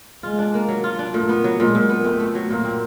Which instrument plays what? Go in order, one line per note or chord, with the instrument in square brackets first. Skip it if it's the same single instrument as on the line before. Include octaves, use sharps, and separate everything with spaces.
[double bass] G#3 [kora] F4
[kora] D4
A#3
F#3
F4
D4
[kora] A#2 [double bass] A3
[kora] B3
F#3
[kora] A#2 [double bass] G#3
[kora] A#2
B3
[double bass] A3 [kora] C4
[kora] A3
F#3
[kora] A#2 [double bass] A#3
[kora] C4